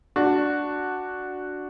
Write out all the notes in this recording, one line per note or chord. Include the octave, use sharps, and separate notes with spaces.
D4 F#4